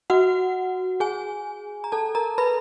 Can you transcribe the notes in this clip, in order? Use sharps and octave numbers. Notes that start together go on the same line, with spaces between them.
F#4 F#5
G#4 G#5
A#5
A4 A5
A#4 A#5
B4 B5